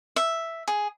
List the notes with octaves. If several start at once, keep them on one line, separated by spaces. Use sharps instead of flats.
E5
G#4